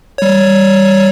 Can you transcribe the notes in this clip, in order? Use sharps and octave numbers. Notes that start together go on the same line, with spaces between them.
G3 C#5